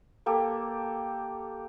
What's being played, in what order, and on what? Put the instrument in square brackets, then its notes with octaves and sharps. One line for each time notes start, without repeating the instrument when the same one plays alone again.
[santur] A#3 G4 A4